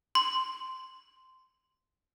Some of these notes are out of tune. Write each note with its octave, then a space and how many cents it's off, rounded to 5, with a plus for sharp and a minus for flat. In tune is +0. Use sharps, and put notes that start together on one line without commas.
C6 -10